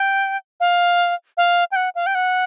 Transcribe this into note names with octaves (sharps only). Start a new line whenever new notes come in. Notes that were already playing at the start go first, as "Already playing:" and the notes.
Already playing: G5
F5
F5
G5
F#5
F5
G5
F#5